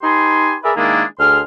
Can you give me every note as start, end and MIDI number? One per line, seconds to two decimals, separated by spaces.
0.02 0.54 63
0.02 0.54 67
0.02 0.54 71
0.02 0.54 80
0.02 0.54 84
0.63 0.71 68
0.63 0.71 70
0.63 0.71 71
0.63 0.71 74
0.63 0.71 76
0.76 1.03 51
0.76 1.03 56
0.76 1.03 58
0.76 1.03 62
0.76 1.03 64
0.76 1.03 68
1.19 1.40 38
1.19 1.40 68
1.19 1.40 84
1.19 1.40 89